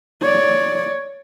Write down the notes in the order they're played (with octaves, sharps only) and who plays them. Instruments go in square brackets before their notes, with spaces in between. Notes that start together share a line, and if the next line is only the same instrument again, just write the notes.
[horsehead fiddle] C#5 D5